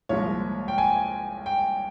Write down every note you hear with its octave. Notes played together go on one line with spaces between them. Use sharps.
C2 A#2 F3 G#3 C#5
G5
G#5
G5